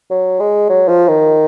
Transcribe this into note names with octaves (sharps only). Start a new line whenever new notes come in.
F#3
G#3
F#3
F3
D#3